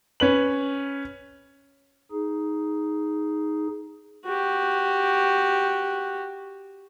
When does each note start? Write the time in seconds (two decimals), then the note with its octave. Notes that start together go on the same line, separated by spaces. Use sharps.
0.20 C#4 B4 F#7
2.11 D#4 G#4
4.26 F#4 G4